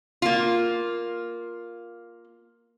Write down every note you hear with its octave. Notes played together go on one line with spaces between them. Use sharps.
A#3 F4